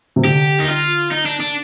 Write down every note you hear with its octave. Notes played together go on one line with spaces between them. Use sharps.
C3
D3 G4
D#4
F4
D#4
D4
D4